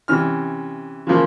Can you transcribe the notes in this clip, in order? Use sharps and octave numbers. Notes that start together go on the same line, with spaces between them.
C3 E3 C#4 F6
C#3 E3 F3 A#3